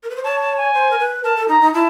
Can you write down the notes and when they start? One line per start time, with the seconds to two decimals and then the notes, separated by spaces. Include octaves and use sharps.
0.03 A#4
0.10 B4
0.16 C5
0.24 C#5 A5
0.40 A5
0.57 G#5
0.74 C5
0.91 A#4
0.99 B4
1.24 A#4 A5
1.36 A4
1.48 D#4 A#5
1.61 D#4
1.74 E4 A5